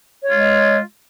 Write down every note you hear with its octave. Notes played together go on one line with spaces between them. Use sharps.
G#3 F4 C#5